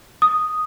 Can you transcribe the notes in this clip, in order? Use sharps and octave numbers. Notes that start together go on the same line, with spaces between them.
D#6